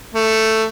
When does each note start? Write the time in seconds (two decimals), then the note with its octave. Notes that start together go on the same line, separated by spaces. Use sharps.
0.15 A3